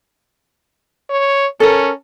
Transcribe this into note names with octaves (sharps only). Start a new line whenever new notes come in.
C#5
C#4 A4 A#4